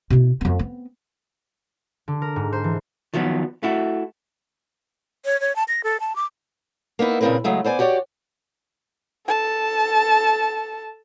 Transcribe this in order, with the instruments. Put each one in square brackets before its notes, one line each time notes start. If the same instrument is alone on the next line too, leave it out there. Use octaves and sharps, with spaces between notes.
[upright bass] B2 E4
F2 B3
B3 C4
[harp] D3
A#4
G#2
C5
E3
[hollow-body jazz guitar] D#3 F3 F#3 B3
A3 E4 F#4
[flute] C#5
C#5
A5
A#6
A4
A5
D6
[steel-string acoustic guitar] A#3 B3 D#4 E4
A#2 C#3 F#3 C4 A#4 B4
C#3 F#3 G#3 A3
B3 C5 D5 G#5
F#4 G4 C#5 D5
[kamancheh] A4 A5